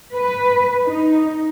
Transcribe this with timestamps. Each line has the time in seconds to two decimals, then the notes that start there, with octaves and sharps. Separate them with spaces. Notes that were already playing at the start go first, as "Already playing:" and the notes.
0.13 B4
0.87 D#4